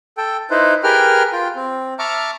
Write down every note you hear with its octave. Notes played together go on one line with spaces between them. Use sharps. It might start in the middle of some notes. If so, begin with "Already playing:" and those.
A4 G5
D#4 E4 B4 C5
G4 G#4 A#4 B4 G5 F6
F4 G5
C4
E5 A5 A#5 C#6 D6 F6